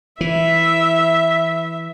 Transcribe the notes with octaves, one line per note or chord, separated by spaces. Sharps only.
E3 E4 E5